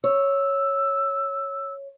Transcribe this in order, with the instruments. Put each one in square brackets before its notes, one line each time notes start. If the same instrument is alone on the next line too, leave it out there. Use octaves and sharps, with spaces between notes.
[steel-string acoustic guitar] C#5 [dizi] E6